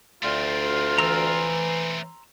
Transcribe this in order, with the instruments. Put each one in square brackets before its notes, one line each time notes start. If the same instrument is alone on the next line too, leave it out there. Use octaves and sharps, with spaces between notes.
[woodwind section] D2 F4 [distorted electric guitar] A3 C4
[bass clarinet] E3 [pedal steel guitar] A#5 C6 E6